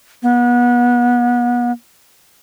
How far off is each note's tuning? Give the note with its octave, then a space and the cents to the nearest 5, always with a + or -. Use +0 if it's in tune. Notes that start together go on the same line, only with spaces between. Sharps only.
B3 -30